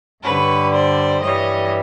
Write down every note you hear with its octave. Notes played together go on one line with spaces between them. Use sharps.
G2 D3 G3 B4 C#5
C5 D5
G2 E3 G3 C#5 D#5